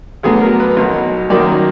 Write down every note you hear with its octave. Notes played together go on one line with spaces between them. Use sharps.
D2 D3 F#3 B3 G#4
A#4
B4
B1 B2 F#3
F#2 D#3 F#3 A#3 D5